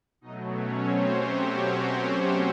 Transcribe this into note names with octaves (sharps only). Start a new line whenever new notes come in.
B2 F#3 A3 D#4 D#5
C#4 C#5
C4 C5
G4
F#4